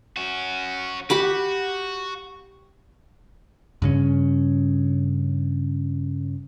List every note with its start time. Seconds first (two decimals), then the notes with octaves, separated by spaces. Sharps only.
0.17 C#4 F#4
1.10 F#4 G4 B5 D6
3.82 G2 C#3 C#4